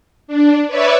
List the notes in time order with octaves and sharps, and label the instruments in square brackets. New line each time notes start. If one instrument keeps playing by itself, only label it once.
[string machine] D4
B4 C#5 D5 E5